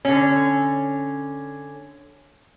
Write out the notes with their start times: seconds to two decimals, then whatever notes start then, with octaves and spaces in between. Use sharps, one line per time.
0.05 D3 C#4